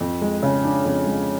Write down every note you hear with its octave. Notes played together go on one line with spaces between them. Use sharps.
F2
G#3
C#3
D4
F2
G#3